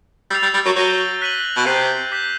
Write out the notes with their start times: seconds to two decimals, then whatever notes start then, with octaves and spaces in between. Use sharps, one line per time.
0.31 G3 E6 A6 C7 F7
0.43 G3
0.54 G3
0.66 F#3
0.76 F#3 G6 A#6 D#7 G7
1.21 F#6 B6 D#7 F#7
1.56 B2
1.66 C3 G6 C7 D#7
2.12 D6 G6 B6